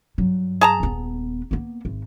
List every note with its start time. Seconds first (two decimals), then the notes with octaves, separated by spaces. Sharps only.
0.18 G2 F#3
0.61 G#4 A5 A#5
0.80 D#1 B3
1.51 A#3 B3
1.85 G#1